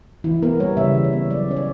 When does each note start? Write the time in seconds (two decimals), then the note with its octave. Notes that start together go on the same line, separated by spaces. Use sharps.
0.24 E3 E4
0.42 B3 A#4
0.59 G3 C#5
0.77 C#3 E5
0.95 E3
1.04 C#5
1.13 B3
1.30 F#3 D5
1.48 C#4 C#5
1.57 D5